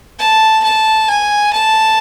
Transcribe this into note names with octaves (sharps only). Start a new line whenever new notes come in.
A5
A5
G#5
A5